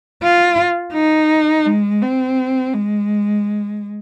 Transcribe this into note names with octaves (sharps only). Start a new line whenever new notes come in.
F4
D#4
G#3
C4
G#3